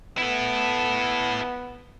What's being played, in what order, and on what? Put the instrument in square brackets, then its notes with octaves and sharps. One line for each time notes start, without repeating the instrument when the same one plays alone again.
[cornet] B3 [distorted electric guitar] E4 A4